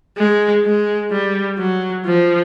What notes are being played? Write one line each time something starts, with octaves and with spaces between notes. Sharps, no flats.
G#3
G#3
G3
F#3
F3